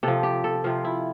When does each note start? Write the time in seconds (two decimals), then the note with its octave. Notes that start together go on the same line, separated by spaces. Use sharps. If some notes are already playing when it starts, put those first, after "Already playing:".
0.03 C3 F3 A4
0.23 G4
0.44 A4
0.64 C3 F3 F4
0.85 E4